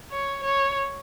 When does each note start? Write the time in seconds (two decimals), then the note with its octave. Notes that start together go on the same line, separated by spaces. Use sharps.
0.11 C#5
0.44 C#5